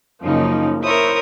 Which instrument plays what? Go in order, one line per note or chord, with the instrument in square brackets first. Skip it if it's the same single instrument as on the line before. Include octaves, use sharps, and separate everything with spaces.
[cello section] F#2 C#3 D#4 [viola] F3 A#3
[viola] E4 C5 [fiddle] A#4 D#6 [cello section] C#5 E5